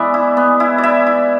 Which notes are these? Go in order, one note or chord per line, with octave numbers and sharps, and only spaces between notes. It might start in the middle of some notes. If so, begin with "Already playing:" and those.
Already playing: E3 G#3 B3 D5 E5
E4
B3
E4
D5
E4 E5
E4